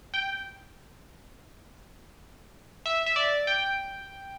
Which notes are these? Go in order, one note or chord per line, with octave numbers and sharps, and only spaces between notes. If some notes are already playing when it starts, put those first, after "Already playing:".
G5
E5
E5
D5
G5